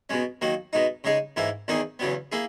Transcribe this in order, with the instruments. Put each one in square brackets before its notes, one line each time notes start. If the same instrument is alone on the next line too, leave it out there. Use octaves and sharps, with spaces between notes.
[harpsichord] B2 G#3 C#4
D#3 F#3 A#3
B2 G#3 D#4
C#3 G#3 D#4 G#4
G#2 E3 A#3 E4
E2 D#3 A#3 D#4 G#4
E2 C#3 F#3 B3
A#3 E4 G#4